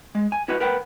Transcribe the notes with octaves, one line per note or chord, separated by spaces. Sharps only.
G#3
G#5
E4 F#4 B4 D#5 F#5
A#4 B4 F#5 G5